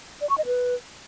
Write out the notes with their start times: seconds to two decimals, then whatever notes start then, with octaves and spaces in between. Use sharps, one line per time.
0.21 D5
0.29 C#6
0.38 D#5
0.46 B4